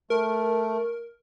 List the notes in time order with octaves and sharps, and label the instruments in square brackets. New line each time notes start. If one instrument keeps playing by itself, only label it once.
[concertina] A3 [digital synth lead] A#4